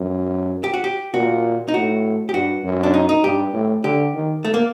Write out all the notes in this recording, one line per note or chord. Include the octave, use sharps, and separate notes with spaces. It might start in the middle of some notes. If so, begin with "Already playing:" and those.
Already playing: F#2
G4
F#4
G4
A#2 F#4
D#4
A2 F#4
G4
G2 F#4
F#2
D4
D#4
D#4
G2 G4
A2
D3 G4
D#3
A3
A#3